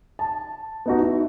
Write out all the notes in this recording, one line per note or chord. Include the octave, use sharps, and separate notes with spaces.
A5
B3 D#4 F#4
E4